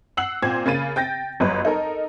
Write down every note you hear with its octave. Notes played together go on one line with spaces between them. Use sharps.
F#5 E6 C7 F#7
A#2 C4 C5 G#6
C#3 A#3 B5 A6 D#7
G5 G6 A6 A#6
G1 F#2 B4 D#5
D#4 A4 A#4